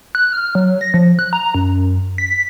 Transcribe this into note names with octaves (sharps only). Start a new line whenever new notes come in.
F#6
F6
F#3
A#6
F3
F#6
A#5
F#2
B6